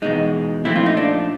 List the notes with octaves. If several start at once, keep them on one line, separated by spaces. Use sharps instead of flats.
E2 B2 G#3 D#4
A#2 F3 A3 C4 E4
F4
D#4
D4